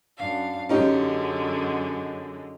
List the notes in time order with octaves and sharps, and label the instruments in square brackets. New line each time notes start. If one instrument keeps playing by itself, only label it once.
[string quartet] F#2 D4 F5
[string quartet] F#2 D3 G#3 [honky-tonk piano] C#4 D#4 G4